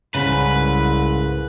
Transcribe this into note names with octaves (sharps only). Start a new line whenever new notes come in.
C2 G#2 C#3 B4